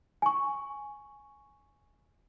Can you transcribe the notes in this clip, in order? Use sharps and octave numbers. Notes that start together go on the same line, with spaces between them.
G#5 C#6